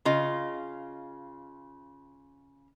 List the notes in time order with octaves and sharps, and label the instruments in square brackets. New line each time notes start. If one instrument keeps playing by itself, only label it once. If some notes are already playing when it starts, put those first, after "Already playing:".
[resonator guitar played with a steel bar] C#3 F4 D#5